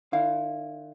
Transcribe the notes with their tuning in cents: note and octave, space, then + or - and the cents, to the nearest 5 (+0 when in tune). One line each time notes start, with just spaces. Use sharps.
D#3 -45 E4 +0 F5 +0